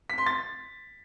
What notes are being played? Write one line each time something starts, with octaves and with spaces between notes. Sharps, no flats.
B6
C6
A6